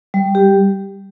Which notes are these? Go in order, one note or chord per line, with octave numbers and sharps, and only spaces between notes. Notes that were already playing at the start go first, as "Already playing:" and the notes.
G3
G4